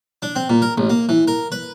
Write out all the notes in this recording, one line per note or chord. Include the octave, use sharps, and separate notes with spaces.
D4
C4
A#2
A#4
A1
A#3
E3
A#4
B4